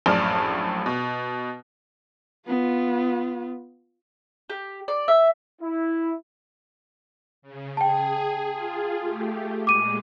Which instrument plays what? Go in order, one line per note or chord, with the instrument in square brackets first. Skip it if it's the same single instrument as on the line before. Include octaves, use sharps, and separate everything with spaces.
[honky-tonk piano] A#1 F#2 A2 D5 A5 F6
B2
[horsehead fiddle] B3 F4
[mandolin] G4
D5
E5
[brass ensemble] E4
[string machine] C#3
[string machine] G#4 [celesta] G5 A5
[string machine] F4 G#4
A3 G4
[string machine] A#2 G#3 [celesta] D6 D#7